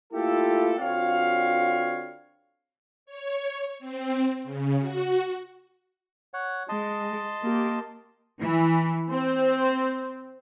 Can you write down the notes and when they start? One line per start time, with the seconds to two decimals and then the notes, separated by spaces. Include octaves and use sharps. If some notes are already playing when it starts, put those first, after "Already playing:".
0.13 A3 A#3 E4 F4 G4 A4
0.79 D3 C4 F4 F#4 C#5 F5
3.06 C#5
3.79 C4
4.44 C#3
4.80 F#4
6.34 C#5 F#5
6.69 G#3 D#5 A5 C6
7.42 A#3 G4
8.43 E3
9.10 C4